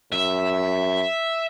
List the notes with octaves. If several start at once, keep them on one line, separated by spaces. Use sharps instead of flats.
F#2 E5